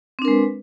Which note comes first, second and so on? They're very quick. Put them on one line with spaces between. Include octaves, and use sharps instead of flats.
C4 D4 A#4 G#3 B4